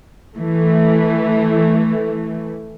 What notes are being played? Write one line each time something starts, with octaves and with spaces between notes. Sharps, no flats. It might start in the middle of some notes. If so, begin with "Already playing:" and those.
E3 A3